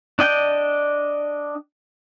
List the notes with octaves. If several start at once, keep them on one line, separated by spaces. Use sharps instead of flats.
D4 D#5 G5